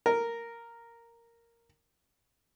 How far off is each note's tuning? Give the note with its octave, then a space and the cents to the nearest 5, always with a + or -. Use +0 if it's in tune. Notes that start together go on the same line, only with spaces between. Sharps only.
A#4 -5